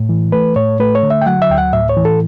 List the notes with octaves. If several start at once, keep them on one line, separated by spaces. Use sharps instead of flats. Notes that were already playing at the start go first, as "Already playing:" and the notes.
Already playing: A2
E3
A3 B4
A2 C#5
A3 B4
C#5
D3
E5
G5
F#3 F#5
E5
D2 G5
F#5
A2 E5
C#5
E3
A4